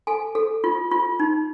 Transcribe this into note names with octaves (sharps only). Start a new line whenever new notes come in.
A4 G#5
A4
F4
F4
D#4